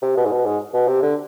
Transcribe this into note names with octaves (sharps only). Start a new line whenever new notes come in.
C3
B2
G#2
B2
G#2
B2
C3
D3